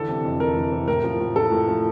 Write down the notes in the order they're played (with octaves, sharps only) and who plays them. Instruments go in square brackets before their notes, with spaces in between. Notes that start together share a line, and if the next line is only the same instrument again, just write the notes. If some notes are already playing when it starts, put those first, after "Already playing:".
Already playing: [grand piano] D3 E3 A4
C3
F2
F2 A#4
E3
C3
A2 A#4
F3
A2
F3 A4
A2
F3